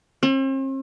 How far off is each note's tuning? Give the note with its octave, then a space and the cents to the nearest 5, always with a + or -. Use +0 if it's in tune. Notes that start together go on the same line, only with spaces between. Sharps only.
C4 +45